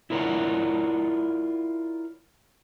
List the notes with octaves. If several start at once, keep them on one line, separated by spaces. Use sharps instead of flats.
E4 F4 A#4 C#5 D5 F#5